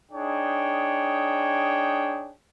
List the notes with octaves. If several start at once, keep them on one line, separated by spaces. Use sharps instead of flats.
D4 D#4 G#4 C#5 G5